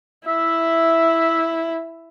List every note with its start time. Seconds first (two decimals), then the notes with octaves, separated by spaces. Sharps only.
0.28 E4 E5